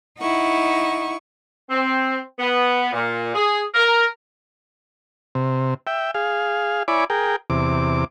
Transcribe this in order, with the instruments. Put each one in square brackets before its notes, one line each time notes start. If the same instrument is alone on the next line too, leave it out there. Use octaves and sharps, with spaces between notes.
[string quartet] D#4 E4 F#5 C#6
[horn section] C4
B3
A#2
G#4
A#4
[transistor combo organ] C3
E5 G5
G#4 F5
E4 C#5 D5 G#5 B5 D6
G#4 A#4 G5
E2 C3 D6